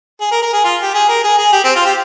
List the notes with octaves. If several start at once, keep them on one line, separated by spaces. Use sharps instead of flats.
G#4
A#4
A#4
G#4
F4
G4
G#4
A#4
G#4
G#4
G4
C4
F4
G4